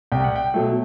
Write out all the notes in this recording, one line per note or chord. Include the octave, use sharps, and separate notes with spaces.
C2 G5
F#5
G5
B2 F#3 A3